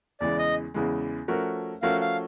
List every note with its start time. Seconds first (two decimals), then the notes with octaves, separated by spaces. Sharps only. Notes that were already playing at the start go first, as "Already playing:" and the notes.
0.21 E2 C#3 E3 G#3 D5
0.39 D#5
0.74 E2 C#3 E3 G#3
1.28 F3 A3 C#4 F#4 A#4
1.82 F3 A3 C#4 F#4 A#4 F5
2.01 F5